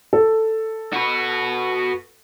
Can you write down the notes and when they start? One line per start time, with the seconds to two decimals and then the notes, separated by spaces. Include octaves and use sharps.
0.13 A4
0.94 F#4 B4